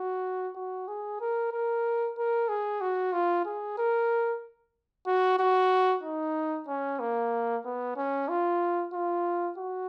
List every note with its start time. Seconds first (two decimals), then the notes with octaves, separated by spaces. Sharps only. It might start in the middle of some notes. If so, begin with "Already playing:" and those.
Already playing: F#4
0.56 F#4
0.88 G#4
1.21 A#4
1.52 A#4
2.17 A#4
2.49 G#4
2.81 F#4
3.13 F4
3.45 G#4
3.78 A#4
5.07 F#4
5.39 F#4
6.03 D#4
6.68 C#4
7.00 A#3
7.65 B3
7.97 C#4
8.29 F4
8.93 F4
9.58 F#4